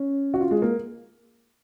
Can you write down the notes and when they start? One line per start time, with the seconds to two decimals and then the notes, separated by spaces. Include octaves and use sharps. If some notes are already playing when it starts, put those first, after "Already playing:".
Already playing: C#4
0.34 F#4
0.41 F4
0.51 G#3
0.62 A#3